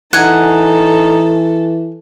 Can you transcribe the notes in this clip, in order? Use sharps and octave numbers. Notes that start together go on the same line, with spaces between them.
E3 D#4 A4 F#5 G#5